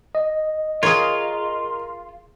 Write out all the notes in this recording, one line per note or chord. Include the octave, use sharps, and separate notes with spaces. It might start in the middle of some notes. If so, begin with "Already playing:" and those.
D#5
F4 G#4 A#4 C#5